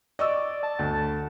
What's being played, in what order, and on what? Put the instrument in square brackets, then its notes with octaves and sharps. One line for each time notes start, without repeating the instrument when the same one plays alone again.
[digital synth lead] D5 [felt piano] D#5 C#6 E6
[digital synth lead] A5
[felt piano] D2